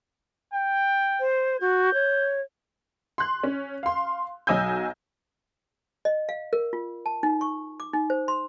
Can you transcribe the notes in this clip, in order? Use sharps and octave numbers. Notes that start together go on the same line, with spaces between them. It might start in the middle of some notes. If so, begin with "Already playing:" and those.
G5
C5
F#4 G6
C#5
C6 F#6
C#4
F5 C6
B1 F#3 D#5 G#5 E6 G6
D#5
F5
A#4
F4
A5
D#4
C#6
D6
D#4
C5
C6